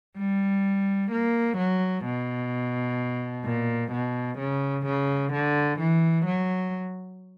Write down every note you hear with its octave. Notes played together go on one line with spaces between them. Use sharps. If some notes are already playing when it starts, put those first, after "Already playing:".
G3
A#3
F#3
B2
A#2
B2
C#3
C#3
D3
E3
F#3